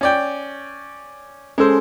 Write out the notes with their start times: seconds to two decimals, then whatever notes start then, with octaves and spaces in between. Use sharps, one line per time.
0.01 C#4 D5 G5
1.58 G#3 C#4 A4 C5